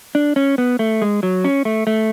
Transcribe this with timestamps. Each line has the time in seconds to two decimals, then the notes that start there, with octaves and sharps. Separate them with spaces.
0.15 D4
0.36 C#4
0.58 B3
0.79 A3
1.02 G#3
1.23 F#3
1.44 C#4
1.65 A3
1.87 A3